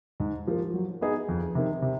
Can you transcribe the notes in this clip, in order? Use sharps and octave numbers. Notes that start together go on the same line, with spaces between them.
G#2
F3 A#3
F#3
B3 D#4 G#4
F2
C3 D#3
C3